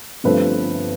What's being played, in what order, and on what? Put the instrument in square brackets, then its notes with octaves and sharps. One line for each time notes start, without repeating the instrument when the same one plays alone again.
[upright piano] G1 G2 F3 A3 C4 B4